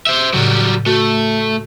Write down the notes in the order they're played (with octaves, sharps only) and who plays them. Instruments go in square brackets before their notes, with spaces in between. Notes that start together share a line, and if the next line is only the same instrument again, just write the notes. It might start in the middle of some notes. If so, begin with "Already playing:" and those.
[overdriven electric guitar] C5 E5
[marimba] A2 C#3 [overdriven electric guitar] F#3 G3
[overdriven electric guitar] A3 [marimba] F#4